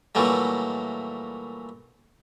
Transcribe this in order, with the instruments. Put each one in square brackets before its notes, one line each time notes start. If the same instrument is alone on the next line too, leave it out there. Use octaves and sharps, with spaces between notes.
[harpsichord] A#2 E3 F#3 G3 A3